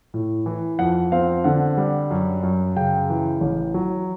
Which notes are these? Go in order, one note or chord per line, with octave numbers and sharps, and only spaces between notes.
A2
E3
F2 F#5
C4 F5
D3 F#5
G3
F#2
F#2
C#3 G5
E3
A1
F#3